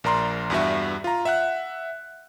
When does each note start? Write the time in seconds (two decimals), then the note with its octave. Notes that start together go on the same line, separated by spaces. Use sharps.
0.04 A#1 A#4 D5 A#5 C6
0.50 E2 G2 F#4 E5
1.04 F4 A#5
1.25 E5 F#5 F#6